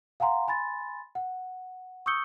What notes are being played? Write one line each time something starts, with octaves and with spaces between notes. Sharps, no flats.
F5 F#5 G#5 A#5 C6
G#5 B5 C6 A6
F#5
C#6 D#6 E6 G6 C#7 G7